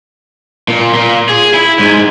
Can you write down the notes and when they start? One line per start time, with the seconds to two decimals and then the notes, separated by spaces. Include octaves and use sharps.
0.68 A#2
0.94 A#2
1.29 G#4
1.54 E4
1.79 G#2